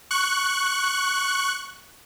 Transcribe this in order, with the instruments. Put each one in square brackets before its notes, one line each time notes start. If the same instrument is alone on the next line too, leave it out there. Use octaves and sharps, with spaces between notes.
[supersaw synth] C#6 F#6